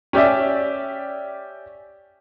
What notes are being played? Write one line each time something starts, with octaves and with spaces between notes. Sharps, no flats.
C#4 G4 D5 E5